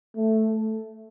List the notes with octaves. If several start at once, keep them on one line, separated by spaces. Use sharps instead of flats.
A3